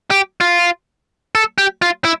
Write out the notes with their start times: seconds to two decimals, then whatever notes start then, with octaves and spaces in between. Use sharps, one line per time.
0.11 G4
0.41 F4
1.35 A4
1.58 G4
1.82 F4
2.05 E4